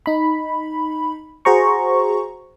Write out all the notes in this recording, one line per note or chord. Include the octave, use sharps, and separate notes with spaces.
D#4 B5
F#4 G#4 C5 A#5 C#6